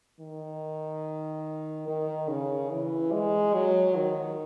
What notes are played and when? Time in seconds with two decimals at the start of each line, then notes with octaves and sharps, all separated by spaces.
0.20 D#3
1.87 D#3
2.29 C#3
2.71 E3
3.13 G#3
3.54 F#3
3.96 D#3